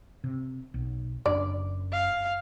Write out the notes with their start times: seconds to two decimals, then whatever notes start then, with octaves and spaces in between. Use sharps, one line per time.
0.24 C3
0.74 B1
1.26 F#1 F#2 D4 D5
1.92 F5